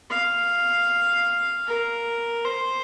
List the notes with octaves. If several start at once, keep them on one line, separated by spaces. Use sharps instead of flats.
F5
A#4
C5